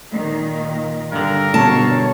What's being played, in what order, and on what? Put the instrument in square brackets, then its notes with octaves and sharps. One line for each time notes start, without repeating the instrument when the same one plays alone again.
[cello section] A#2 D#3
[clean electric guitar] G2 D3 [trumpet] A#4
[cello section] B2 C#5 [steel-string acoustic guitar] A5